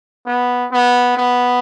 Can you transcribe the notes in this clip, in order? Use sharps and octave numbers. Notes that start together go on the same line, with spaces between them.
B3
B3
B3